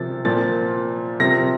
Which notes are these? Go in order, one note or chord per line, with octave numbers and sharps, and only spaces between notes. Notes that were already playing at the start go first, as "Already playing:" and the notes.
Already playing: C3 F3 A6
A#2 F3 A6
C3 F3 A#6